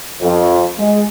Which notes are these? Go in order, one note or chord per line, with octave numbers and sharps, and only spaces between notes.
F2
G#3